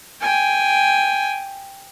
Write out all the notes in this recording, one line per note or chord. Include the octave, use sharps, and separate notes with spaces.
G5 G#5